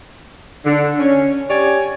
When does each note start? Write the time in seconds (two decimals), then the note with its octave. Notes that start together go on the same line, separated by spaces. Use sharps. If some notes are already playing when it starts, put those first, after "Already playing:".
0.65 D3
0.99 C#4
1.50 G4 C#5 D5 G#5